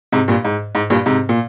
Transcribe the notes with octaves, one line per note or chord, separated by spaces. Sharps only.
G#2 C3
G2 A#2
G#2
G#2
G2 A#2
G#2 C3
A#2